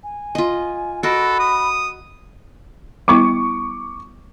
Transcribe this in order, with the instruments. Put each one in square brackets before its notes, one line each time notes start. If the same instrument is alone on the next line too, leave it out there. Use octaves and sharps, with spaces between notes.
[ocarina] G#5
[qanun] F4 D#5
[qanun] F#4 A#4 D#5 [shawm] A4 [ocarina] B5
[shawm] D#6
[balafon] G3 B3 E4 [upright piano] C#6 D6